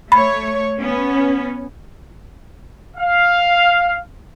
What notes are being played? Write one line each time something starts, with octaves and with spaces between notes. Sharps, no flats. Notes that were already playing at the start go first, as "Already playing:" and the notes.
A3 C#5 B5
B3 C#4
F5